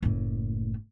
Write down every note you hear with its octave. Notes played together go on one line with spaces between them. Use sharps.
F#1 A2